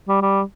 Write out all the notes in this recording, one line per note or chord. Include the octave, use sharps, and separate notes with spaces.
G3
G3